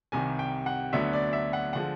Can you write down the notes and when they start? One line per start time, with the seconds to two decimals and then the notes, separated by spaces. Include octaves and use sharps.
0.12 C2 C3 D#3 G3 G#5
0.39 G5
0.66 F#5
0.93 D2 D3 F#3 B3 D4 E5
1.13 D5
1.33 E5
1.53 F#5
1.73 D3 F3 G#3 F#5